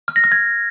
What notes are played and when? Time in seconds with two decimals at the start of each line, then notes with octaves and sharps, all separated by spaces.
0.08 F6
0.16 A#6
0.24 F6
0.32 G#6